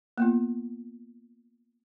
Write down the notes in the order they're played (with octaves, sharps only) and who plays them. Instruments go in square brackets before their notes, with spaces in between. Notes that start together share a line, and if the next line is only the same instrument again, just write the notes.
[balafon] A#3 B3 F4